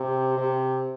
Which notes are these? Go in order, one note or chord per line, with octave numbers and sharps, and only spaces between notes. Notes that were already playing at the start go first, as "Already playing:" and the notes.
Already playing: C3
C3